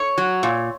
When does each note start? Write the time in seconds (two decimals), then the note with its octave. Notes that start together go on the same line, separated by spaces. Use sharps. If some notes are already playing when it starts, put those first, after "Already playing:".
Already playing: C#5
0.18 F#3
0.43 A#2